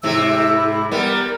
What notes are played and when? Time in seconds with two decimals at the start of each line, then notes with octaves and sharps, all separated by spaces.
0.03 G#2 C3 E4 E6
0.57 B5
0.92 G3 B3 A#4